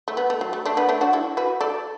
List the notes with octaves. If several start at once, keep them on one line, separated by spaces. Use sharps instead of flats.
A3
B3
A3
F#3
A3
A3 D4
B3
A3 D4
D4 F#4
E4 A4
F#4 B4
A4 D5